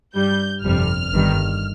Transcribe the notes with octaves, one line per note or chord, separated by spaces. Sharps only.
G2 G3 G6
G1 F2 C3 G3 F6
G1 G2 D#3 G3